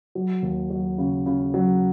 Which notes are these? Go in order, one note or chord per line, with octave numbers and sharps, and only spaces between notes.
F#3
D#2
F#3
C#3
C#3
F#3